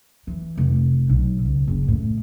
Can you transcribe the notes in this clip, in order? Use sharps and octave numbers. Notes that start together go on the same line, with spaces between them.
E3
F1
B1
C#2
F#1
A2